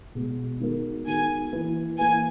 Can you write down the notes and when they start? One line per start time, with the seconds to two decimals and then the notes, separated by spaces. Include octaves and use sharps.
0.15 B2 G#3 B3
0.60 D#3 G#3 B3 F#4 A#4
1.06 D#3 G#3 B3 F#4 A#4 G#5
1.53 E3 A#3 E4 B4
1.99 E3 A#3 E4 B4 G#5